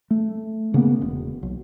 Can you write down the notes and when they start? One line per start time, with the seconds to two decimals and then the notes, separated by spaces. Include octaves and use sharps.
0.11 A3
0.74 C#3 A#3 B3
1.02 E1
1.43 B1